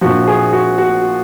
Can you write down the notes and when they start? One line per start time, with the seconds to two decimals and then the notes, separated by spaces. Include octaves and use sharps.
0.01 A#1 A#2 F3 F#4
0.28 G#4
0.53 F#4
0.78 F#4